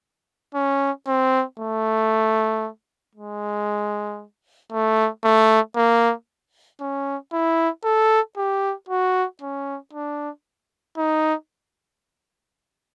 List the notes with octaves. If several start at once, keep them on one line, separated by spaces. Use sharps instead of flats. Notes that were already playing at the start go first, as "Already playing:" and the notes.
C#4
C4
A3
G#3
A3
A3
A#3
C#4
E4
A4
G4
F#4
C#4
D4
D#4